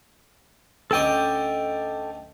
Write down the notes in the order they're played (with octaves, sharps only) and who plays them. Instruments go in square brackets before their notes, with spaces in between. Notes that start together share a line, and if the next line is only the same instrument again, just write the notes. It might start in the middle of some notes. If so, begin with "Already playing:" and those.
[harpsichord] D2 C#4 D#5 [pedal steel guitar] A4 G5 D6